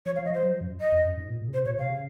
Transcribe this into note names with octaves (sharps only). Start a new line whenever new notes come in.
F3 C#5
F5
F3
D#5
F3
C5
F#3
F3
F#2
D#5
F2
F#2
G#2
A#2
A#2
C#3
C3 C5
A#2 C#5
C3 F5
C#3